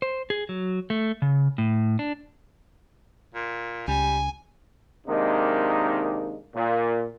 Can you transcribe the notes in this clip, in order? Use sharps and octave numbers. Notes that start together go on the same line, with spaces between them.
C5
G#4
F#3
A3
C#3
A2
D4
A#2
C#2 G3 G#5
C3 D#3 G#3 A#3 D4 D#4
A#2